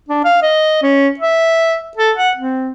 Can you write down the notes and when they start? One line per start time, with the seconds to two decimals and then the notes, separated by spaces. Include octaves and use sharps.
0.09 D4
0.24 F5
0.42 D#5
0.82 C#4
1.19 E5
1.97 A4
2.17 F#5
2.36 C4